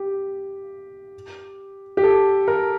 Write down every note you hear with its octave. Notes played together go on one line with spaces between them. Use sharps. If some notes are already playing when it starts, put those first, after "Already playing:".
Already playing: G4
G4
A4
A#4